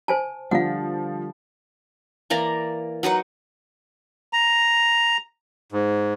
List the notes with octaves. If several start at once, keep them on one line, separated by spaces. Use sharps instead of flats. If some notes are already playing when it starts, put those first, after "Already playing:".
C5 G#5 A5
D3 F3 G3 D4 F5 F#5
E3 A#3 D5 A#5
F#3 D#4 B4 F#5
A#5
G#2